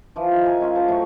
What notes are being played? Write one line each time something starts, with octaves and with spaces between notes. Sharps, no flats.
E3 F3
D#3
A#4 G#5
G#3 C#4 F4
C5 A5
A2 F#3 C#6